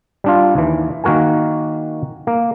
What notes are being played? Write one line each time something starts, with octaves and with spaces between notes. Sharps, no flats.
G3 D4 F4
D#2 E3
D#3 A#3 F#4 A#4 G#5
A#3